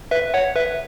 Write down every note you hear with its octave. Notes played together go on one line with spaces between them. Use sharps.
B4 E5
C#5 F#5
B4 E5